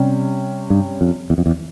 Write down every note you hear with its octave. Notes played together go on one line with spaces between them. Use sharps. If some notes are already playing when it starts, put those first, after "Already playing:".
Already playing: C3 G3 C#4
G2
F2
E2
F2
E2